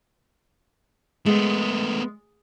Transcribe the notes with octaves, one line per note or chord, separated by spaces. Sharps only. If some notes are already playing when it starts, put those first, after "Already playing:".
G#3 A3 B3